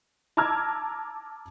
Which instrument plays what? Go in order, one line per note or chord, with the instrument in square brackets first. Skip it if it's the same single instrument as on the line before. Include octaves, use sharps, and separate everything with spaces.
[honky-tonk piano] A5 A#5 D6 E6 F6 G#6